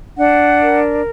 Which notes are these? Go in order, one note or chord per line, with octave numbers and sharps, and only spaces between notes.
D4 F#5
A#4